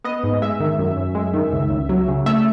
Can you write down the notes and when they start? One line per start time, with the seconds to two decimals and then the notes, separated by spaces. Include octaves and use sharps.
0.04 B3 D#5
0.23 G#2
0.42 G#3 E5
0.60 D#3
0.79 F#2
0.97 F#2
1.15 G#3
1.34 D#3
1.52 C#2
1.70 C#2
1.89 F#3
2.08 C#3
2.26 A3 E5